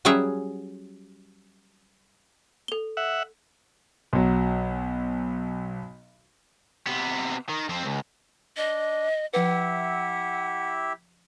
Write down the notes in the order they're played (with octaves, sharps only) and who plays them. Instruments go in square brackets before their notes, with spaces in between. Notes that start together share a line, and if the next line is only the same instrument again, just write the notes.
[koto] F#3 G3 C#4 G#4 E5 F#5
[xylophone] A4 G7
[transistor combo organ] E5 F#5
[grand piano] B1 F#3
[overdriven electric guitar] C3 B3
D#3
F2 C4
C#2
[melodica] D4 [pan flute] D#5
[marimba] F3 B4 [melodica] E4 G4 E5 [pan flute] F#5